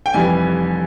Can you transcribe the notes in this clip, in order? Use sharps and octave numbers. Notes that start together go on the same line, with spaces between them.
G5
F1 F2 E3 G3 G#5